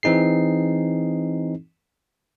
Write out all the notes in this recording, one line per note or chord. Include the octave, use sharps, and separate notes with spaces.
E3 C4 D#4 G#4 C7